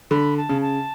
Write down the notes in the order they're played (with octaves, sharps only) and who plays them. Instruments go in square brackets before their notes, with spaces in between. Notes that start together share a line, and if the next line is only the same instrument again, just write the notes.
[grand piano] D3 [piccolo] B5
[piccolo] A5
[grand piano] C#3
[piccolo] A5